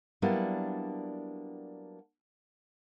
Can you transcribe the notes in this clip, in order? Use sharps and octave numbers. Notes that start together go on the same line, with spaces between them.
F#3 G3 A#3 B3 D4 E4